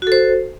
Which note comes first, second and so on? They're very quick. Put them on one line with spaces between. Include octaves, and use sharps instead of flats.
F#4 A4 C5